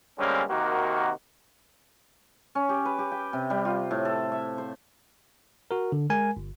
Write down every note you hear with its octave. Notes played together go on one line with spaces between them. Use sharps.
D3 G3 G#3 A#3 C4 C#4
C3 D#3 A#3 F#4
C#4
G4
B4
G4
G5
C3
G3
F4
A2
A4
E5
C5
F#4 A#4
D3
G#3 A#4 G#5
G1